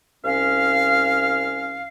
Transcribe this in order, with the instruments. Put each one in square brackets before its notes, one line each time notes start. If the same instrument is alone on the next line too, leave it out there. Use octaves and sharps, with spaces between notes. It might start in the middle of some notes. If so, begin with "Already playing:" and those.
[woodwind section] C2 C#4 F5